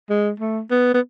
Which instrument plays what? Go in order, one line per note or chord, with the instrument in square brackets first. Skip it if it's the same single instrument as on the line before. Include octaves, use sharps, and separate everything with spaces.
[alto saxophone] G#3
A3
B3
B3